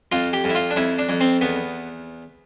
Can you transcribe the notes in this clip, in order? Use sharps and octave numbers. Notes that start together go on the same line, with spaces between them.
F2 F4
G4
F2 E4
F4
D4
F2 E4
D4
F2
C4
E2 B3